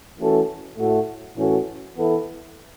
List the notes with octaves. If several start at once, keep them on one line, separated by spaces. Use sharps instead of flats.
E3 A3 C#4 F#4 A4
A2 A3 F#4
A2 E3 C#4 F#4 A4
E3 B3 E4 A4